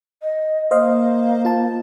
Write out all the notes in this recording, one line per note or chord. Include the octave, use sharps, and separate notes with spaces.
D#5
A#3 C5 D#5 F5
F4 A5